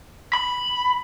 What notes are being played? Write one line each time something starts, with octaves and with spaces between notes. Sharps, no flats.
B5